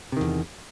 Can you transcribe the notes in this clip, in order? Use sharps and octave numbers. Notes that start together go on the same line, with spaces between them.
E2 C3 D#3